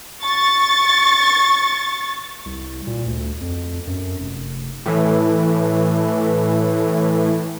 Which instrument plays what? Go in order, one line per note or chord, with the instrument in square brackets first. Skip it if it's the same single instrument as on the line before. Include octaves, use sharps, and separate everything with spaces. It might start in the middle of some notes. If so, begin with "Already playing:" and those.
[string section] C#6 A6
[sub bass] C2
A#2
D2
F2
F#2
F1
[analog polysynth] A2 E3